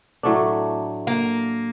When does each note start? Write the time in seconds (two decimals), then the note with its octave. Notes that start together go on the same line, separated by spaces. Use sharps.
0.23 A2 F#3 A3 D4
1.07 A#3